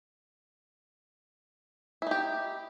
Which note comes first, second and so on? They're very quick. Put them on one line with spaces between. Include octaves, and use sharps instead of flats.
E4 D#4 G4